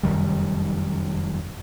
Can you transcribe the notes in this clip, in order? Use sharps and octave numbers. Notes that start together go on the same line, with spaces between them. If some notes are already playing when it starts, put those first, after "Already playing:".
F1 F#2 D#3 G3